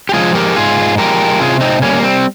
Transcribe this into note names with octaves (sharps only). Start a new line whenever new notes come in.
G4
F3 G#3 F4 G#4
G4 A#4
G#2 F4 G#4
F3 G#3 G4 A#4
C3 F4 G#4
C4 D#4
G3 A#3 C#4
A#3
C4